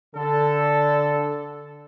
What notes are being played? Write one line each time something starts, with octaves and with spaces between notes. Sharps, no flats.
D3 A4